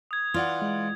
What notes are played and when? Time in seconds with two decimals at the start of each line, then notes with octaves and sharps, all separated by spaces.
0.11 D#6 G#6
0.34 E3 F4 D5 F#5
0.62 G#3